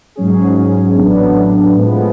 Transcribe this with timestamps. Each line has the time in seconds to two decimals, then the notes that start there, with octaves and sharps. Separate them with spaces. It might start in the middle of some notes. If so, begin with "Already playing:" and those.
0.16 G#2 F#3 C#4 G#4
0.96 A1 A2 F#3 B3 D4
1.76 A2 F3 G#3 B3